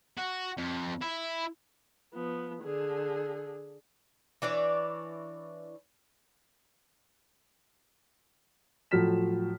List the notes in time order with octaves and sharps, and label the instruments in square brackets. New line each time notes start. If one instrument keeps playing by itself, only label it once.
[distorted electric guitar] F#4
F2
E4
[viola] F3 B3
D3 G#4
[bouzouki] E3 D4 C#5 D5
[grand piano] A2 F3 F#3 F6 B6 E7